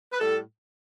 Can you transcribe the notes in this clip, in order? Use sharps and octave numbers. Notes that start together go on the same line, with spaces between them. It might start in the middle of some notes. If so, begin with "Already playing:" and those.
B4
A2 G3 A4